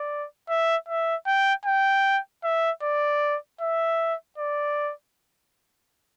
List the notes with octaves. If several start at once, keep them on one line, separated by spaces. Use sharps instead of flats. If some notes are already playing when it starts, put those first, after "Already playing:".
Already playing: D5
E5
E5
G5
G5
E5
D5
E5
D5